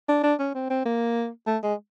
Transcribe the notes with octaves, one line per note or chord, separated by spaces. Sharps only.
D4
D4
C#4
C4
C4
A#3
A3
G#3